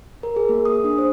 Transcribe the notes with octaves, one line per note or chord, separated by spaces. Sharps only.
A#4
G#4
A#3
D#6
D4
C5